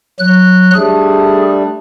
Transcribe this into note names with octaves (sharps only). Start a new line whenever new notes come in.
F#3 F#6
G3 A3 D4 G#4